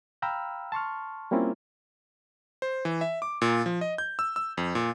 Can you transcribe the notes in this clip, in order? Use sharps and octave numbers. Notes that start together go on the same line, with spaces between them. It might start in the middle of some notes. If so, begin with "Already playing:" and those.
F5 G5 A#5 B5 E6 F6
A5 C6 C#6 F6
G3 A#3 C4 C#4 E4 F4
C5
E3
E5
D6
A#2
F3
D#5
G6
E6
E6
F2
A#2